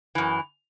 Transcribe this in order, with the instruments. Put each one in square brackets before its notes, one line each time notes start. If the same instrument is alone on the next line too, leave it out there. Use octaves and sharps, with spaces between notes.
[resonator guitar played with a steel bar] F#2 E3